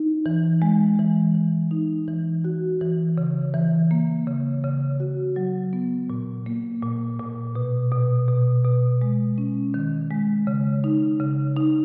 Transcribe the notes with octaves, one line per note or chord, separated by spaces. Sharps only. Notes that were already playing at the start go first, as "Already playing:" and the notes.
Already playing: D#4
E3
G#3
E3
E3
D#4
E3
F#4
E3
C#3
E3
A#3
C#3
C#3
F#4
F#3
B3
A#2
A#3
A#2
A#2
B2
B2
B2
B2
G#3
C#4
D#3
G#3
C#3
D#4
C#3
D#4